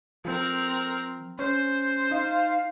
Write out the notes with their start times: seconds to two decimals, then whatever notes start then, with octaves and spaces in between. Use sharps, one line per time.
0.25 F3 C4 A#4
1.39 C#4 C5
2.11 D#4 F5